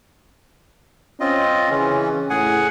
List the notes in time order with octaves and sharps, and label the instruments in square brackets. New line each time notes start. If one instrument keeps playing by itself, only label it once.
[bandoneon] C4 F4 D#5 [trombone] C#4
[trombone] C#3 [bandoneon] E3 C#4
[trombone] A2 [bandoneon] G#4 F#5 G#5